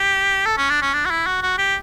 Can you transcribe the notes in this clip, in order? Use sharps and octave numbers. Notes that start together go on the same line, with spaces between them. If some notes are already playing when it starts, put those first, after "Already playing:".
Already playing: G4
A4
C#4
D4
C#4
D4
F#4
E4
F#4
F#4
G4